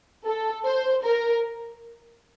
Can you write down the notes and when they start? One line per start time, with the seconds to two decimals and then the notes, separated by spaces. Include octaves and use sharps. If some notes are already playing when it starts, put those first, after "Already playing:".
0.25 A4
0.65 C5
1.05 A#4